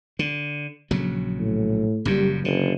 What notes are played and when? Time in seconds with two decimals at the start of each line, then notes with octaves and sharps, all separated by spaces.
0.19 D3
0.91 A#1 C#3 F#3
1.39 A2
2.05 F#1 F#2 A#2 G3
2.45 F#1 D3